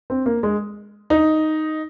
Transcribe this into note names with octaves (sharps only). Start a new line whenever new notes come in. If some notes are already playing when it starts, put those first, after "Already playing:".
C4
A#3
G#3
D#4